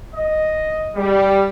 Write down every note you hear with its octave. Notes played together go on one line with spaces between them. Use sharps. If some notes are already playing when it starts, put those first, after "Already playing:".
D#5
G3